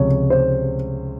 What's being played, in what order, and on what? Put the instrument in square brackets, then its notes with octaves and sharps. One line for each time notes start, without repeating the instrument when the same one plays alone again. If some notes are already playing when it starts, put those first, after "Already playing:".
Already playing: [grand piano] C#2 C3 F3 C#5
C5